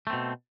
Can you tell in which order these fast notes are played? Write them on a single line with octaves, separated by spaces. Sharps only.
A3 C4 B2